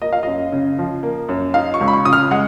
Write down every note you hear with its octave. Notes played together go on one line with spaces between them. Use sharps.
A#3 D#5
F5
F#2 D#5
C#3
F3
A#3
F#2
D#4 F5
C#6
C#2
B5
C#6
C#3 D#6
F6
G#3 F#5